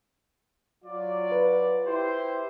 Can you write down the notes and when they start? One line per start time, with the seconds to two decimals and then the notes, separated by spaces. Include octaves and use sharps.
0.85 F#3 F4 D5
1.32 B4
1.86 E4 G4 C5